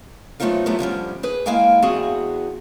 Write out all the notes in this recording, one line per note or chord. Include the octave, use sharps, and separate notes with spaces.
F#3 A3 B3 C4 D#4 F4
F#3 A3 B3 E4 F4 G4
D3 F3 G3 C#4
G#4 B4
G#3 A#3 E4 F5 G5 G#5
E2 B3 C4 F#4 G#4